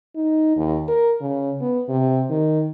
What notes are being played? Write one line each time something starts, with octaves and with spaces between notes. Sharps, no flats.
D#4
D#2
A#4
C#3
B3
C3
D#3